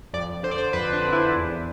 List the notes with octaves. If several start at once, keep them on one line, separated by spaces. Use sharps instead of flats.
F2 D5
D3 C5
D5
C5
F2 B4
D4
D3
E4
E2